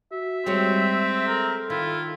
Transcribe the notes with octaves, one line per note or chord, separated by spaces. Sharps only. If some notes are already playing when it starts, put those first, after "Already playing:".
F#4 E5
G3 G#3 C4 C#5
A4 A#4
D#3 E4 F4